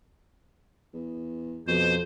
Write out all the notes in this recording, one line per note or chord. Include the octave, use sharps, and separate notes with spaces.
E2
F2 B2 C5